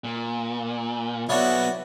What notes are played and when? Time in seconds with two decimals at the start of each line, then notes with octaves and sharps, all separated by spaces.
0.04 A#2
1.29 B1 B3 E4 F#4 C#5 D5